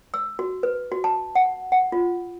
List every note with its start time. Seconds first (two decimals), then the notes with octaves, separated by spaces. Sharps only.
0.14 E6
0.39 F#4
0.63 B4
0.92 F#4
1.04 A5
1.35 F#5
1.72 F#5
1.92 F4